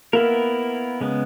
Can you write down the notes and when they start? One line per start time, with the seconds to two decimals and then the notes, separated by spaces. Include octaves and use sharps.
0.13 A#3 B3 E4 A#4
1.01 C#3 G#3 B3